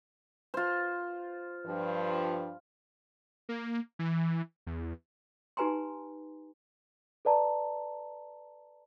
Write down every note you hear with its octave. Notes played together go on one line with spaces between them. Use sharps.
F4 C5
G2 F3
A#3
E3
E2
D#4 G4 B4 G#5 A#5 C6
A4 B4 D5 A5 A#5